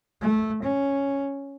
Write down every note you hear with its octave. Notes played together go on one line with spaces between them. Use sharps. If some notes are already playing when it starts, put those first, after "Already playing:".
A3
C#4